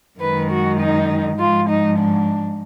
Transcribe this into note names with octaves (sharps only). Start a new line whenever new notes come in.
F#2 D#3 G#3 B4
F#4
D#4
G#2 F3 G#3 F4
D#4
D4